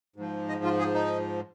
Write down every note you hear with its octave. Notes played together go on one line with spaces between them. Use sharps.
G#2 F3
D#5
F4
G#4
D#4